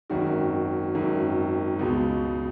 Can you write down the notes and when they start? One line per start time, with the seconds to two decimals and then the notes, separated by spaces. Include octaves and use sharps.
0.10 G#1 F#2 D#3 F#4
0.95 G#1 F#2 D#3
1.79 C#2 B2 G#3